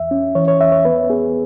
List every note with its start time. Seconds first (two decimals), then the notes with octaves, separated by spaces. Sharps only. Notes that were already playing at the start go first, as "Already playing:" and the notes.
Already playing: E2 E5
0.11 C#4
0.35 E3 C#5
0.48 C#5
0.60 E2 E5
0.72 C#5
0.85 B3 B4
1.10 B3 G#4